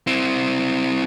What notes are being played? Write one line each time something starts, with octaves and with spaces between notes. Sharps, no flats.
C4 E4